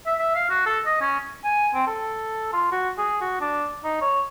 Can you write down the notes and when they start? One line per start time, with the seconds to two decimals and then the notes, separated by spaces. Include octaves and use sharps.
0.06 E5
0.19 E5
0.35 F5
0.50 F#4
0.66 A4
0.86 D#5
1.01 C#4
1.44 G#5
1.74 C4
1.87 A4
2.53 F4
2.71 F#4
2.98 G#4
3.21 F#4
3.41 D4
3.84 D#4
4.01 C#5